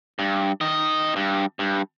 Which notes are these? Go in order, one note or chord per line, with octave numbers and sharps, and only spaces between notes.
G2
D#3 D#5
G2
G2